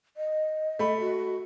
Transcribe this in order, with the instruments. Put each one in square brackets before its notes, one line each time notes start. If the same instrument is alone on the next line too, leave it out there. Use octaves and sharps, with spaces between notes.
[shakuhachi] D#5
[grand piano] A3 B5
[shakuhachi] F#4